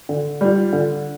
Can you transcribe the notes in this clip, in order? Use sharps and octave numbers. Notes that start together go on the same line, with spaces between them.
D3
G3 F4
D3